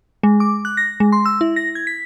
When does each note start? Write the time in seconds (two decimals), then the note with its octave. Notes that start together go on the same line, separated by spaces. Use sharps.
0.23 G#3
0.40 D6
0.65 F#6
0.77 A#6
1.00 G#3
1.12 C6
1.26 E6
1.41 E4
1.56 A#6
1.75 G#6
1.87 B6